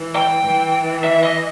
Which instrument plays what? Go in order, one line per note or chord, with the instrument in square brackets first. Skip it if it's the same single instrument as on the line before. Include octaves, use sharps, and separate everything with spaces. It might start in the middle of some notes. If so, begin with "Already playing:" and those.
Already playing: [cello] E3
[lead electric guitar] G5
[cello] E3
[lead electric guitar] E5
D#5